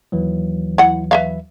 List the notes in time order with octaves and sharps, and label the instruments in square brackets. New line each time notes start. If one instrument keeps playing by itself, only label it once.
[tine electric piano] D#2 E3 F#3
[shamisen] E4 F#5
B4 E5 F5